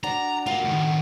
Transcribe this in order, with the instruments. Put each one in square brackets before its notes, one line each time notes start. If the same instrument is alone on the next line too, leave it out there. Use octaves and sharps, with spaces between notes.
[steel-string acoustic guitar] D4 F#4 D5 [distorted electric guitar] A#5
[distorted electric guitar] F4 A#4 [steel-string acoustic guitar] F#4
[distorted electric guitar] A2 D#3